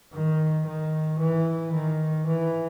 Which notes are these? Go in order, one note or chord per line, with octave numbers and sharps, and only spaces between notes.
D#3
D#3
E3
D#3
E3